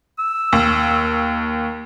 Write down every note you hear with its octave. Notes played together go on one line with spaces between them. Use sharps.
E6
D#2